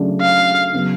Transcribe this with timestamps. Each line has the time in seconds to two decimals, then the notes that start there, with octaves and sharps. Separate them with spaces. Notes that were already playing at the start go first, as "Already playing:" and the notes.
Already playing: C#3 F#3 A3 D4
0.21 F5
0.73 C#3 F#3 B3